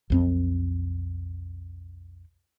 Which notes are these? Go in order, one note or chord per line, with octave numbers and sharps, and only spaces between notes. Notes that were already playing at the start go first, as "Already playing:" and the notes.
B1 F2 C4